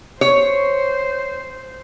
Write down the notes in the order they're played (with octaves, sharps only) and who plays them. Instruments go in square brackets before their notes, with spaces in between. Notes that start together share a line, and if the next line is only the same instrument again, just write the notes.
[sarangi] C5 [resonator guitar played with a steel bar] C#5